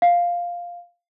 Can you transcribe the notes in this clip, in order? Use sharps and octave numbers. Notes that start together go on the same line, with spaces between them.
F5